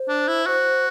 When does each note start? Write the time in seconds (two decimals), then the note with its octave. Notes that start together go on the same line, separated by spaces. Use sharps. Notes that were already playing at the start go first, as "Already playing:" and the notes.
Already playing: C5
0.08 D4
0.28 E4
0.46 F#4 C5